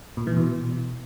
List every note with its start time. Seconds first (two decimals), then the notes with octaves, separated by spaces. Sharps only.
0.17 A#2
0.27 E3
0.37 B2